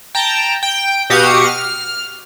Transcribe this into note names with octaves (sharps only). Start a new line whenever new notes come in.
G5 A5 A#5
G5
B2 F#4 G4 F5 D#6 C#7
F6